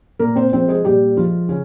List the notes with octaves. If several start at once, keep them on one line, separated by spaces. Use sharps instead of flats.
A#2 A#3 A#4
C4 C5
F3 G#3 C4 C5
G#3 G#4
A#2 G3 G4
F3 G#3 F4
C#3 C#4